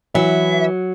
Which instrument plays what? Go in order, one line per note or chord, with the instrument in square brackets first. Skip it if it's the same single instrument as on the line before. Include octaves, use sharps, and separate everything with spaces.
[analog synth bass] E3 [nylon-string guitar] F#3 [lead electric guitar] E5